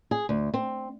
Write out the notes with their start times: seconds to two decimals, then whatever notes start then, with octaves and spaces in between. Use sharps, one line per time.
0.11 G#4
0.29 D2
0.54 C4